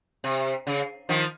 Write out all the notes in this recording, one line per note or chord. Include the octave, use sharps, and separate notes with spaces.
C3
C#3
D#3 F3